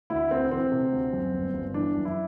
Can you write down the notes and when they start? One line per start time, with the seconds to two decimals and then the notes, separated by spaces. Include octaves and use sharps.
0.10 D2 E4
0.31 D2 C4
0.51 E3 C4
0.72 C3
0.92 D2
1.13 F#2
1.34 G1
1.54 G1
1.74 E3 D4
1.95 F#2
2.05 E4